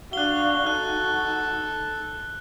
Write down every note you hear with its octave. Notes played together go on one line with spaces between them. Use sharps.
D4 F#4 F5 F#6 G7
D#4 A4 F#6